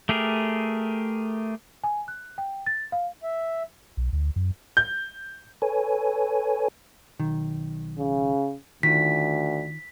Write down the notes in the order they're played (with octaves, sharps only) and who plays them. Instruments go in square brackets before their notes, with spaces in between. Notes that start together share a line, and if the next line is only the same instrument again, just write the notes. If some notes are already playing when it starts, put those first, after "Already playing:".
[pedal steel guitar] A3 G4 G#4 A#4
[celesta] G#5
F#6
G5
A6
F5
[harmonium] E5
[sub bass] B1
D2
F#2
[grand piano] G6
[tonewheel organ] A4 B4 C#5 G#5
[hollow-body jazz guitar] B1 D#3
[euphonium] C#3
[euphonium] D2 [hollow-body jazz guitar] D#3 F4 [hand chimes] B6